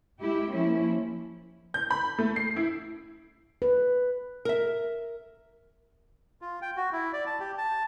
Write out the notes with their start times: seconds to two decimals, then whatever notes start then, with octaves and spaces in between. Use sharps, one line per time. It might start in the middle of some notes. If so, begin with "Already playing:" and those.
0.22 G#3 E4 G4
0.52 F3 A#3 C#4 E4
1.74 G6
1.91 B5
2.18 A3
2.36 C7
2.56 E4
3.62 B4
4.45 A#4 E5
6.41 F4
6.62 G5
6.77 F#4
6.93 E4
7.13 D5
7.26 A5
7.40 G4
7.58 A5